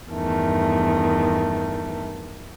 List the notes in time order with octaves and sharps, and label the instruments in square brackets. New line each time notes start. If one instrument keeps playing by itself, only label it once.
[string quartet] E2 G2 D#3 A3